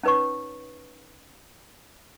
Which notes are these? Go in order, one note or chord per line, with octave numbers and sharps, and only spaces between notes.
C#4 D#4 B4 C#5 C#6